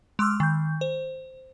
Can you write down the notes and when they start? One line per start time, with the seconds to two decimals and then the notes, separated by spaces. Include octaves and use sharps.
0.19 G#3 C6 D6 E6 F6
0.40 D#3 G6
0.81 C5